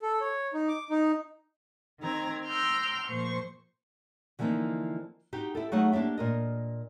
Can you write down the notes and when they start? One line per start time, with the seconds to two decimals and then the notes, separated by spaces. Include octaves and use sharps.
0.02 A4
0.21 C#5
0.54 D#4
0.68 D6
0.90 D#4
2.00 D#3 C4 A#5 G#6
2.46 G5 A#5 C6 E6 F6 G6
3.07 A#2 F3 C5 C#6
4.39 D3 E3 F3 A#3 C4 D#4
5.33 D#4 F#4 G4
5.55 E4 G4 A4
5.72 F#3 A3 D#4 G#4 F5 F#5
5.92 A#3 D4 E4 G4 E5
6.18 A#2 A#4 D#5